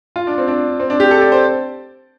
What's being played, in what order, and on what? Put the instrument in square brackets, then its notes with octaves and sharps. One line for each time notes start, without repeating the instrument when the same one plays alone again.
[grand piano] F4
D4
C4
D4
C4
D4
G4
A4
D5
C5